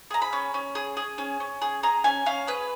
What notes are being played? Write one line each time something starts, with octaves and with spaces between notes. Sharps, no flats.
G#4 A#5
B5
C#4
C#4
G#4
G#4
C#4
C#4
G#4
G#4 A#5
C#4 G#5
C#4 F5
G#4 B4